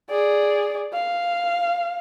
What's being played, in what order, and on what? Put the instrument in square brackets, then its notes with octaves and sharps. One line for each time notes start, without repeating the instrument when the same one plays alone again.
[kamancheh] G#4 D5
F5